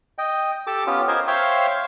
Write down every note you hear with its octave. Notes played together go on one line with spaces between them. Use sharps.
D#5 G5
G4 A4 A5 D6
B3 C#4 F4 G4
A#4 C5 D#5 G#5
C5 C#5 E5 F5 G5 C6